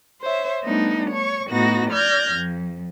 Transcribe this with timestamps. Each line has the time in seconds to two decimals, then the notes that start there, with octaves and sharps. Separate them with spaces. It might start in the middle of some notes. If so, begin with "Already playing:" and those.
0.21 C5 C#5 E5
0.63 G3 A3 B3 D4 D#4
1.11 C#5 C#6
1.51 A2 B3 D#4 F#4 A#6
1.92 D5 F6 G6 G#6 A#6
2.34 F2